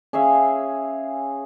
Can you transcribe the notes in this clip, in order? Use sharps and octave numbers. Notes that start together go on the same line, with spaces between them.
C#4 G#4 E5 F5